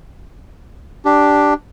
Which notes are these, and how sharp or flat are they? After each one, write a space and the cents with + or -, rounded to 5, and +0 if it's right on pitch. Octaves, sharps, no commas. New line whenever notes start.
D4 +0 G4 +0